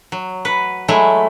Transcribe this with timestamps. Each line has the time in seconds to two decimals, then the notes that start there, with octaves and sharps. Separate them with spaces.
0.12 F#3
0.45 B4 F#5
0.88 F#3 G#3 A3 E4